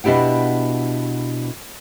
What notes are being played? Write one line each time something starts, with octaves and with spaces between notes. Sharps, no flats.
B2 D4 E4 G4 F#5